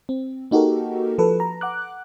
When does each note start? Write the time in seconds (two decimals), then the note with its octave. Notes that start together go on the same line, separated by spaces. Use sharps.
0.09 C4
0.51 A#3 D#4 F#4 G4 A4 A#4
1.18 F3 A4 B4
1.40 A#5
1.61 F#5 D6 F#6